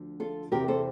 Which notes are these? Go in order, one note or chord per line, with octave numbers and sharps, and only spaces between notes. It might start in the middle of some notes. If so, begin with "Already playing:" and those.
Already playing: D2 D3 F3
F4 A4
E2 C3 E3 G4 A#4
A4 C5